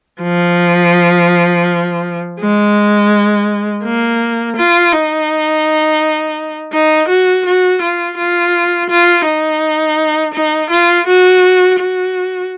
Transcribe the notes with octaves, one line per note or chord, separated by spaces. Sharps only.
F3
G#3
A#3
F4
D#4
D#4
F#4
F#4
F4
F4
F4
D#4
D#4
F4
F#4
F#4